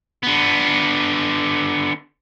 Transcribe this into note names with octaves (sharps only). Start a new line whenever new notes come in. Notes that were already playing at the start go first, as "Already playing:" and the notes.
D3 B3